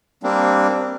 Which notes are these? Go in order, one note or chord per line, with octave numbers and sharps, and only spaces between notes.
G3 A#3 C4 D4